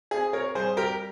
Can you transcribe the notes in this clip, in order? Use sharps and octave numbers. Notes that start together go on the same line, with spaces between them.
C4 G#4
A#4 C#5
G3 G#4 C5
G4 A#4